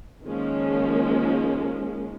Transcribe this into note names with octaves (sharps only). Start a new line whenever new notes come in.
D#3 F3 G#3 A#3 C#4